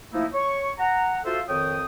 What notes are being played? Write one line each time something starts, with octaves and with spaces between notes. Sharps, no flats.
F3 A3 A#3 D#4 E4
C#5 C#6
F#5 A#5
F4 F#4 A4 C5 E5 F5
F2 D#3 C#5 G5 D#6